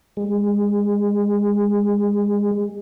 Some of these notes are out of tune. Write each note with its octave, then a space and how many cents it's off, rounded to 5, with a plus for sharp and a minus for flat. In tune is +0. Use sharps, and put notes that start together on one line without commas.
G#3 -25